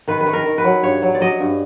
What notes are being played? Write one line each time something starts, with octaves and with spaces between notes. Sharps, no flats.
D#3 B4
B4
D#3
A#4
D#3
B4
F#3
G2 C#5
F#3
D5
F#3 D#5
G2